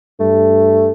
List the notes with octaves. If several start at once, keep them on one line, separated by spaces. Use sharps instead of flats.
G2 A3